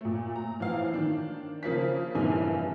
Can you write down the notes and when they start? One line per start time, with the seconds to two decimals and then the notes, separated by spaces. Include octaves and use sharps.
0.01 A#2 A3
0.36 A#5
0.60 A2 E3 F3 E4 F5
0.93 D#3 D4
1.63 C#3 F3 A#3 B6
2.15 F1 A#1 G2 D#3 E3 G#5